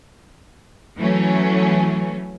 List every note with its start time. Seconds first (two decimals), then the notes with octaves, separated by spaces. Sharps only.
0.97 E3 F#3 A3 C#4